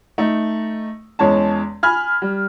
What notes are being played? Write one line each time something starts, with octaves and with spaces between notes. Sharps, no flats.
A3 D#4
E2 G#3 C#4 C#5 A5
G#5 B5 F6 G#6
G3